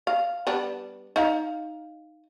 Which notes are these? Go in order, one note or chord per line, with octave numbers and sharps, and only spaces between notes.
F5
G3 B3 D4
D#4 F5